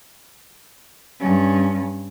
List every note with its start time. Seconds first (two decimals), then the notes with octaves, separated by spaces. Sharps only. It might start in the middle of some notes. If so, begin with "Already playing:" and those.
1.20 G2 C#4